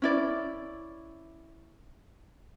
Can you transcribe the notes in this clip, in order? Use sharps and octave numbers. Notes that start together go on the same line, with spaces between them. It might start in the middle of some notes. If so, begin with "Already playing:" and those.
C#4 E4 D5